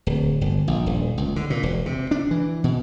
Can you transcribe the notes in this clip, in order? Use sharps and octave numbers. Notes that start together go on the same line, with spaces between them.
D1
G1
A#1
D#1
C#2
D3
A#2
E1
C3
D4
E3
B2